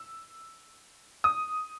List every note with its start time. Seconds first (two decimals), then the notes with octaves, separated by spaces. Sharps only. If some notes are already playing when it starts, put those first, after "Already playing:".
Already playing: E6
1.24 D#6